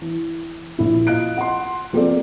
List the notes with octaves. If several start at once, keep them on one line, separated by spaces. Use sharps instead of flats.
E3
A#1 E4
F4 D#5 F5 F#6 D7
F#5 C6
F3 A#3 C4 G#4 A4 D5